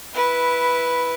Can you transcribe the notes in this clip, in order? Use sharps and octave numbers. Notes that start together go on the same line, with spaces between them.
E4 B4